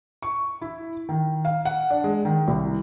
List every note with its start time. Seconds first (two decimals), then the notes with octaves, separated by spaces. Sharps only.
0.22 C#6
0.62 E4
1.09 D#3
1.45 F5
1.65 F#5
1.90 D4
2.04 G#3
2.25 D#3
2.48 C2